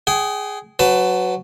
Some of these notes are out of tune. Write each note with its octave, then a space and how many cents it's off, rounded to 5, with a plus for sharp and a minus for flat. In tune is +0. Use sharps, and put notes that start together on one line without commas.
G#4 +0 G5 -35
F#3 +0 B4 +25 A5 +0